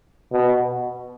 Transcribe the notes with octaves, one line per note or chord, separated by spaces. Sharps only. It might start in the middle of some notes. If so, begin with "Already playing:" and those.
B2